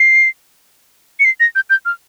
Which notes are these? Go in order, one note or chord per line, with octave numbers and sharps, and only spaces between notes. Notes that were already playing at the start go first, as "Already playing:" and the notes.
Already playing: C7
C#7
C7
A#6
G6
G6
F6